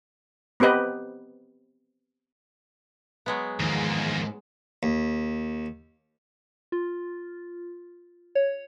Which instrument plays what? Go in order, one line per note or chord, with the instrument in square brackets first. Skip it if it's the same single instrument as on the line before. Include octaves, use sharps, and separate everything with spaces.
[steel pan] B3 C4 G4 B4 D#5
[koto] F#3 G#3 B3
[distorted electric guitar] E2 A#3 [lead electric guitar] G#2 [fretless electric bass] D#3 F3
[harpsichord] D#2
[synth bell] F4
C#5